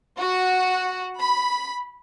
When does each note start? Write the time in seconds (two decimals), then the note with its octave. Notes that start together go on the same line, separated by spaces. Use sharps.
0.17 F#4
1.18 B5